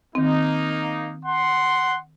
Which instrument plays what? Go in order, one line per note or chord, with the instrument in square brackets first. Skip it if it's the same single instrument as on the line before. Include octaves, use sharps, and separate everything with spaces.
[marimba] D#3 C4 [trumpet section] A#3 D#4
[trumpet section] F#5 C6